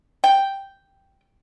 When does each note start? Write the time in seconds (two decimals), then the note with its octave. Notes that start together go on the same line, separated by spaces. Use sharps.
0.24 G5